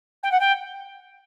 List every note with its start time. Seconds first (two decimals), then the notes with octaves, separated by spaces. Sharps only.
0.23 G5
0.31 F#5
0.39 G5